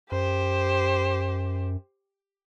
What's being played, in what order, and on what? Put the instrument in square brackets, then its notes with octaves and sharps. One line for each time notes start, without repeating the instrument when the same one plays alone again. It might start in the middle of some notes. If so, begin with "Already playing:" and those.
[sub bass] F#2 [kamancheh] G4 C5